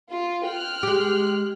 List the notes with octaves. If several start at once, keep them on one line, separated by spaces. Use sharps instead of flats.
F4
G5 F6 F#6
G#3 G4